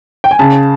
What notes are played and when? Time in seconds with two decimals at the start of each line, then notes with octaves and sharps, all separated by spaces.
0.24 G5
0.31 G#5
0.39 C#3 A5